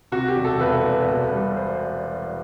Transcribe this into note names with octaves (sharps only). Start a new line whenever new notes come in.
C3 F#4
G4
E1
A4
E1 B4
E2
B2
G3
C5